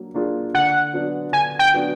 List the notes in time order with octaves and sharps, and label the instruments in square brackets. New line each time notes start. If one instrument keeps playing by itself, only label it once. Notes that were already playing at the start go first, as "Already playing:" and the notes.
Already playing: [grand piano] F#3 A#3 D4
A#3 D4 F4 G#4
[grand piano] D3 [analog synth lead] F#5
[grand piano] F#3 B3 D4 F#4
[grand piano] D3 [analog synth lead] G#5
[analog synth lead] G5
[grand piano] F#3 B3 D4 F#4